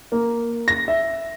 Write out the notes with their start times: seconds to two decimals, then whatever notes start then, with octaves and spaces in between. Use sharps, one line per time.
0.12 A#3
0.68 A#6
0.88 E5